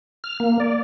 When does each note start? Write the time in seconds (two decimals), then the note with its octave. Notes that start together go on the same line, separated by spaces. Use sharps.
0.24 F6
0.40 A#3
0.60 D5